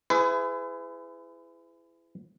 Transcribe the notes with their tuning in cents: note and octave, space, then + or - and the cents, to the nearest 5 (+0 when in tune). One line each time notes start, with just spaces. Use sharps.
E4 +20 G#4 +0 B4 +40